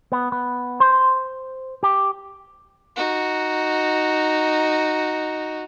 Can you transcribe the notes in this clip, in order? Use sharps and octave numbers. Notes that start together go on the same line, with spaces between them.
B3
B3
C5
G4
D#4 F#4